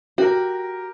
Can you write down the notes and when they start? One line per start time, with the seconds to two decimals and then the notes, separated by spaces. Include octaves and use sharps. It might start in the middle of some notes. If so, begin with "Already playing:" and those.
0.18 F#4 G4 A#4